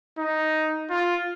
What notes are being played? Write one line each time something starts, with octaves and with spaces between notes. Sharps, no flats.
D#4
F4